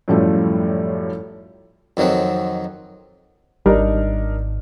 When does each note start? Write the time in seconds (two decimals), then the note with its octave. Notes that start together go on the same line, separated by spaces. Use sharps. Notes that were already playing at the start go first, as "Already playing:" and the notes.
0.08 F#2 A2 F3 G3 A3
1.97 F2 D#3 F#3 C4 F#5
3.66 G#1 G3 D4 D#4 A#4